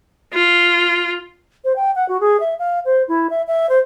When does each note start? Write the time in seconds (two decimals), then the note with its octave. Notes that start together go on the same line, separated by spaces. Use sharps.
0.33 F4
1.64 C5
1.76 G5
1.95 F#5
2.09 F#4
2.21 G#4
2.40 E5
2.59 F5
2.85 C5
3.08 E4
3.30 E5
3.47 E5
3.69 C5